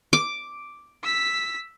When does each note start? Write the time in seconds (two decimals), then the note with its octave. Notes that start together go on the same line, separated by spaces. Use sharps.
0.13 D6
1.03 E6 B6